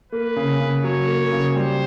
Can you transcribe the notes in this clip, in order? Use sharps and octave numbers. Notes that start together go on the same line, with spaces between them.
A#3 B4
C#3
C#3
F#3 C#5
A#3
C#3
G3 C5